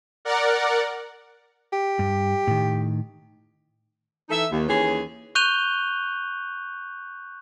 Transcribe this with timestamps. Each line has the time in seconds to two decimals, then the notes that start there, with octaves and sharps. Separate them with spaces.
0.25 A#4 D5 F#5
1.73 G4
1.99 G2
2.47 A2 D#3
4.30 E3 D#4 A4 E5
4.51 D#2
4.69 D#2 E3 C#4 G#4
5.35 C#6 F#6 G6 D#7 F7 G7